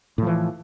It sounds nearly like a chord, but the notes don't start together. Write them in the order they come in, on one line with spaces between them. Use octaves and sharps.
A2 F3 E3